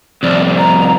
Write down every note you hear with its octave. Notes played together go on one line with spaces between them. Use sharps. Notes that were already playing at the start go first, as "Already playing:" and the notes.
C2 F2 D5
A#5